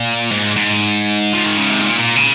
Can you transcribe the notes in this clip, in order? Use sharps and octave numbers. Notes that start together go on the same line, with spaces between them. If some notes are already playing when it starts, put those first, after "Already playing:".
Already playing: A#2
G#2
G#2
F3
D#3
C#3
C3
A#2
A#2
C#3